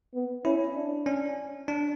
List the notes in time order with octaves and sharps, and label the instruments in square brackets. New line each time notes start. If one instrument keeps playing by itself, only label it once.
[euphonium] B3
[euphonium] C#4 [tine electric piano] E4
[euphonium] D4
[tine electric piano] C#4
D4